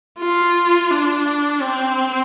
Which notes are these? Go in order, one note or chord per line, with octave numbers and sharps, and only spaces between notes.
F4
D4
C4